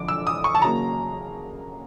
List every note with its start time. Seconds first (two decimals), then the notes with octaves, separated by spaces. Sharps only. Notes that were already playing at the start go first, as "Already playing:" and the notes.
Already playing: F2 D3 D6
0.08 E6
0.27 D#6
0.44 C#6
0.55 A5
0.62 C#3 F#3 A#3 A#5